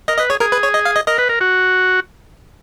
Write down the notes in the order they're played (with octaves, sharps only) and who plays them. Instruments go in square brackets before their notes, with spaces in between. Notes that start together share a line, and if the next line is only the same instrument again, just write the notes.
[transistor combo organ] A#4 [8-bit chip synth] D#5
[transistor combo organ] B4 [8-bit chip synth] D#5
[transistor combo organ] G#4 [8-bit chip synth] C#5
[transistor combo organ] G#4 [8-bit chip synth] A#4
[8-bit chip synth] B4
C#5
D#5
F5
D#5
[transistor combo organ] A#4 [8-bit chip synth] D#5
[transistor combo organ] B4
A#4
F#4